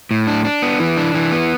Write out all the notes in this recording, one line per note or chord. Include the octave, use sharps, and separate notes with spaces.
A2
D4
D4
B3
E3
D4
E3
B3